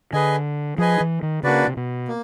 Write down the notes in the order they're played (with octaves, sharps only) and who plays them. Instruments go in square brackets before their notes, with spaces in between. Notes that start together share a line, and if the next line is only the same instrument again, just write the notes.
[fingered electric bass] D3 [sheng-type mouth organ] G#4 B4 D#5 G#5
[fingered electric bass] F3 [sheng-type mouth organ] G#4 B4 D#5 G#5
[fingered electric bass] E3
D#3
[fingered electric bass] C#3 [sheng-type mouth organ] A#3 D4 F#4 B4 D5
[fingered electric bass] C3
B2
[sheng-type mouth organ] A#3